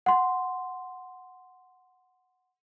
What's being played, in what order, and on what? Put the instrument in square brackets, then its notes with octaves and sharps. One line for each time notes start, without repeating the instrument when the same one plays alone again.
[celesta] F#5 C6